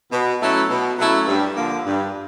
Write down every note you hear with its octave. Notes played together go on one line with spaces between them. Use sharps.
B2
F#3 A3 C#4 E4
B2
F#3 A3 C#4 E4
G2
D3 F3 A#3
G2